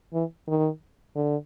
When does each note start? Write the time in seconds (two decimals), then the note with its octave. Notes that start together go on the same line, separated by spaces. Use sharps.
0.13 E3
0.48 D#3
1.16 D3